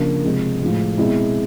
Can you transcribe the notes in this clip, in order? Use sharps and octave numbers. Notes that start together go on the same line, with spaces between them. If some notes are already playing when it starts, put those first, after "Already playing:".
Already playing: C#3 F3 A#3 D4
C3 F3 G#3
A2 F3 G#3
B2 G#3 C4 E4